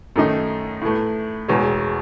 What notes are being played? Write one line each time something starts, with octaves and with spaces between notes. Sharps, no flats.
F#2 D#3 A3 D#4
A2 E3 A3
E1 E2 B2 G#3